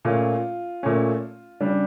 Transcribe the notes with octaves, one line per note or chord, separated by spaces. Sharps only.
A#2 A3 C#4 F4
A#2 A3 C#4
C#3 G3 D4